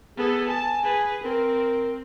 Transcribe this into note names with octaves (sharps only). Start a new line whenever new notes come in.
B3 G#4 A4
G#5 A5
G#4 B4
C4 A#4